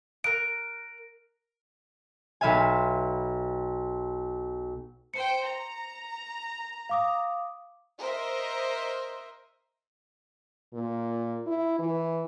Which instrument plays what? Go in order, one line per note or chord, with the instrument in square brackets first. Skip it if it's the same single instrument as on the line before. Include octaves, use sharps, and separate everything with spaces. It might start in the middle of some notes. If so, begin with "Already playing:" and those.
[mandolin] A#4 A#5 F#6 [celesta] D7
[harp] B1 B4 E5 F5 G#5
[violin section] C5 G5 [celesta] C#7
[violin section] A#5
[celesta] F5 D6 D#6
[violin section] A#4 C5 D#5 E5
[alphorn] A#2
E4
E3